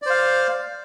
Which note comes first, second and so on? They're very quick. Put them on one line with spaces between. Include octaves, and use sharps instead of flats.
D5 C5 F5